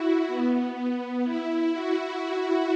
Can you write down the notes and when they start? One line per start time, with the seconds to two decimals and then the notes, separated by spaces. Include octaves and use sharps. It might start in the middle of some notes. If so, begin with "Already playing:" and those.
Already playing: E4 F#4
0.27 B3
1.24 E4
1.72 F#4